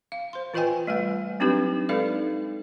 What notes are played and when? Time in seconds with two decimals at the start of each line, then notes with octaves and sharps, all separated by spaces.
0.12 F5
0.33 C5 C6
0.54 E3 F4 B4 D#5 G5 G#5
0.87 G3 A3 B4 F#5
1.40 F#3 C4 D4 D#4 G4 B4
1.89 G#3 D#4 A4 B4 D5 F5